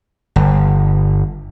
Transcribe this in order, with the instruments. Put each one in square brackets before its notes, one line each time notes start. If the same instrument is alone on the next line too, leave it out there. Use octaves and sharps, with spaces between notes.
[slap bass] G1